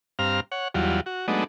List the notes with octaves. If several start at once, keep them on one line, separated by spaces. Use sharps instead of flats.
G2 C4 F5 A#5 F6
C#5 F#5
E2 F#3 G3 F4
F#4
F#3 G#3 A3 B3 D4 D#4